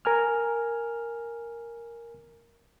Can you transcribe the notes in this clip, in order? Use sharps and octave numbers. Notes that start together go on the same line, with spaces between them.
A#4 G#5 F6